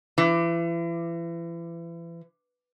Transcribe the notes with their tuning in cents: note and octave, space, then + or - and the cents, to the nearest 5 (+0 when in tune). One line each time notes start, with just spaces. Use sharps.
E3 +35